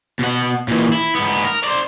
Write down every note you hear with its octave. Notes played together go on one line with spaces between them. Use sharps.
B2 F#5
A#2 E3
E4
G#2 B3
A#4
C5 D5